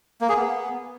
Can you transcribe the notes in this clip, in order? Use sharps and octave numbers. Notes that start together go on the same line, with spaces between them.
A#3
G#4
B3